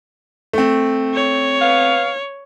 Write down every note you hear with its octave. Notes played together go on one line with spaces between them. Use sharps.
A3 C4
C#5
B3 F5